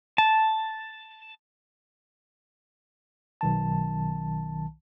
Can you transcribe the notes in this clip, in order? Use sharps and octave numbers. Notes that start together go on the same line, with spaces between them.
A5
B1 D#3 A5